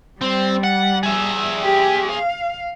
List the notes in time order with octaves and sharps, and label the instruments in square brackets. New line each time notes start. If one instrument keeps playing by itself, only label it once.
[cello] G3 [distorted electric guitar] C4
[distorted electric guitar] F#5
G#4 E5
[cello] G4
F5